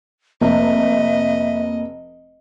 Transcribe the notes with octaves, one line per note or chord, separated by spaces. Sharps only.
F1 A#3 D#5 E5